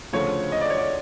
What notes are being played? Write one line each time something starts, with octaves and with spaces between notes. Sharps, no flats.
D2 C#3 F3 A3 C#5
D#5
D5
C#5
D5